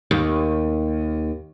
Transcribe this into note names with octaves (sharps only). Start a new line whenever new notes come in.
D#2